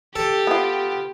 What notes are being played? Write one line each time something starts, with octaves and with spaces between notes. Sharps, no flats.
G4 A4
B3 F4